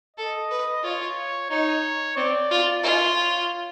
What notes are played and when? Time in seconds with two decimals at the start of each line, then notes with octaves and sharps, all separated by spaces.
0.17 A4 D#5
0.51 B4
0.83 F4 C#5
1.50 D#4 C#5
2.17 C4 D5
2.51 F4
2.84 F4 C#5